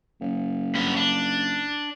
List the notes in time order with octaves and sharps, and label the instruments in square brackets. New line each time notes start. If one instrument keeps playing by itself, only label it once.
[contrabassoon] F#1
[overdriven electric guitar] G2 B3
D4